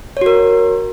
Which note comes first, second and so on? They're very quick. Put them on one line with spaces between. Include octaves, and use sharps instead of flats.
C#5 F#4 A#4